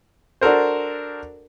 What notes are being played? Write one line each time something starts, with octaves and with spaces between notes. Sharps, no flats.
D4 F#4 A4 A#4 C5